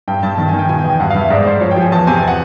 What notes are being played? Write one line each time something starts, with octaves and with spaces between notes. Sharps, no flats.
G2 G5
G2 A5
D#3 A5
G#5
D#3
G5
B2 G#5
G5
E2
G5
G2 F#5
F5
G2
E5
G#2 D5
G#2 C5
F3 C#5
G5
F3 G#5
E2 A5
C3 G#5
F#5